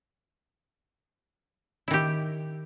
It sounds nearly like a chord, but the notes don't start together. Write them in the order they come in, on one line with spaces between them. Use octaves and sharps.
E4 D#3 G4